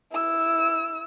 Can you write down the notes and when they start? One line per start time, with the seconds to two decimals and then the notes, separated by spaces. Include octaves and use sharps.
0.12 E4 E6